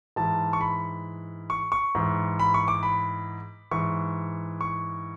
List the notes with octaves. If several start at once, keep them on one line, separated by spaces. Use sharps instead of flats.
G#2 E3 A5
C#6
B5
C#6
C#6
G#2 E3
B5
C#6
D6
B5
G#2 E3 C#6
C#6